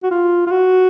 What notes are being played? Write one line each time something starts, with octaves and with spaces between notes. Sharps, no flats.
F#4
F4
F4
F#4